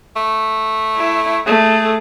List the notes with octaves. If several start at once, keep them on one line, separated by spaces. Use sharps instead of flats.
A3
E4
A3 G#4